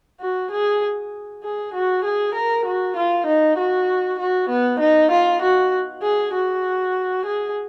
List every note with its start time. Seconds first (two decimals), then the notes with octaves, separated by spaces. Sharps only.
0.21 F#4
0.51 G#4
1.43 G#4
1.74 F#4
2.04 G#4
2.35 A#4
2.66 F#4
2.96 F4
3.27 D#4
3.58 F#4
4.19 F#4
4.49 B3
4.80 D#4
5.11 F4
5.42 F#4
6.03 G#4
6.34 F#4
7.26 G#4